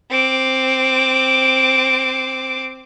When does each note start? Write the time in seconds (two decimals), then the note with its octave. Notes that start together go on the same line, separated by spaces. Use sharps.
0.11 C4 D6